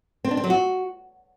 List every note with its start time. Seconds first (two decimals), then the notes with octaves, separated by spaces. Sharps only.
0.25 C4
0.31 D4
0.37 C4
0.44 F#3
0.50 F#4